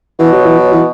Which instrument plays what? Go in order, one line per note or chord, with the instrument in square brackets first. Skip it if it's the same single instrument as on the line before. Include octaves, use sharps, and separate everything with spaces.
[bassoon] B2 [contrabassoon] E3
[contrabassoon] F#3
E3
F#3
E3